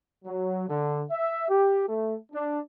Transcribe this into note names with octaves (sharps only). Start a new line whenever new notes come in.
F#3
D3
E5
G4
A3
D4